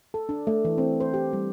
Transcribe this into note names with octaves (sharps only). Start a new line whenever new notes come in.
A4
D4
A3
E3
C4
C5
G4
G3